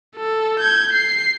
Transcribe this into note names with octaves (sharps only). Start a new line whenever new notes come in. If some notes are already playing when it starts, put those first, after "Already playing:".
A4
G6 G#6
C7